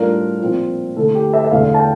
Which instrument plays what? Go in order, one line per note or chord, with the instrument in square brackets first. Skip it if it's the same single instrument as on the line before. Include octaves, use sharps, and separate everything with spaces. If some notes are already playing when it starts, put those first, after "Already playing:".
Already playing: [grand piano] A2 G3 D4 F4 A#4
A#2 F3 C4 F4
D3 A3 E4 A4
G4
E5
E5
E2 D3 A3 F5
A5
G5